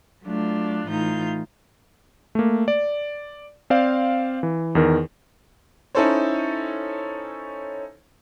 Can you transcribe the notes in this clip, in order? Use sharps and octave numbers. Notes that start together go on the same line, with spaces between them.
F#3 A3 D4 F4
A2 E3 D#4 F4 G6
A3 A#3
D5
C4 C5 D5 F5
E3
E2 D#3 A#4
C#4 D#4 E4 A4 C5 C#5